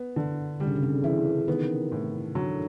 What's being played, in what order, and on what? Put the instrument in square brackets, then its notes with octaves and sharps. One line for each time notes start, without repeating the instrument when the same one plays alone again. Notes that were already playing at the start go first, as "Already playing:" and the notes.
Already playing: [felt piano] B3
D3
[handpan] D3 [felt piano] G3
[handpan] C#3
C3
C#3
[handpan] E3 [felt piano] E4
[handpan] D#3 [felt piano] B3
[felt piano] A2
[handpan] D3 [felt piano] F#3